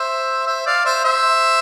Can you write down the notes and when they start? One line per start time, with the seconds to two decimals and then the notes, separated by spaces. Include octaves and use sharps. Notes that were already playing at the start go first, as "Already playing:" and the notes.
Already playing: C5 E5
0.47 C5 E5
0.66 D5 F5
0.85 C5 E5
1.04 C5 E5